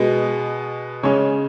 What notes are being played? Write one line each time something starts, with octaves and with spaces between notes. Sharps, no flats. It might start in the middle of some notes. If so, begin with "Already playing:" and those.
Already playing: B2 G#3 B3
C#3 G#3 C#4 C#5